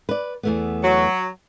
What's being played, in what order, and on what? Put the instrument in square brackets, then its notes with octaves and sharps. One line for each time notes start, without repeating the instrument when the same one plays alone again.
[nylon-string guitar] B4 D5
E2 A3 B3
[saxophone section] F#3